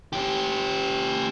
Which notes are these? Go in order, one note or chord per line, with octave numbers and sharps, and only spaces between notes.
C#4 G4